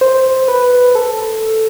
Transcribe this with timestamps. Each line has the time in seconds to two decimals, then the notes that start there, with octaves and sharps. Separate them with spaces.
0.01 C5
0.48 B4
0.95 A4